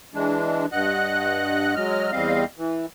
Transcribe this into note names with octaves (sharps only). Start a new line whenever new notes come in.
E3 G#3 D4
G2 D#5 F#5 F#6
F#3 G#3 D#5 F6
E2 G3 C4 D#5 F5
E3